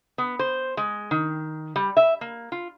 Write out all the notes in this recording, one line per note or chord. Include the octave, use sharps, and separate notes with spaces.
B3
C5
G#3
D#3
G3
E5
A#3
F4